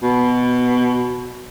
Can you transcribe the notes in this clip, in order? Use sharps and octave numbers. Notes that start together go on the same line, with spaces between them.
B2